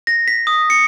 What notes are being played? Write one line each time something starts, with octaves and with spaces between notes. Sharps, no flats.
A#6
B6
D#6
C#7